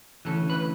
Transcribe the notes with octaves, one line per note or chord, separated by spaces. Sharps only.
D2 C#3 E3 A4
B4